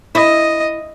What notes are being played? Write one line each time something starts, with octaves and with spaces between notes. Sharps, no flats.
E4 D#5